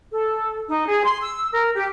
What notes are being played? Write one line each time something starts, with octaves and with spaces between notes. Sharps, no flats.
A4
D#4
G#4
C6
E6
A#4
G4